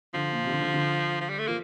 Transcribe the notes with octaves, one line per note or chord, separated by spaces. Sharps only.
D3 F3
A#2
C3
D3
D3
D3
F3
G3
A3
F3 A#3